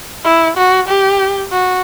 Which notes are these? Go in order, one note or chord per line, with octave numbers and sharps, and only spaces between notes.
E4
F#4
G4
F#4